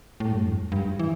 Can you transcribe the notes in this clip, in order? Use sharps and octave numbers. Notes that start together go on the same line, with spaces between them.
A2
G2
F2
G2
E3